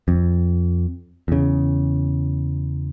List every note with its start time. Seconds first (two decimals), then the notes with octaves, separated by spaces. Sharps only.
0.08 F2
1.28 E2 C#3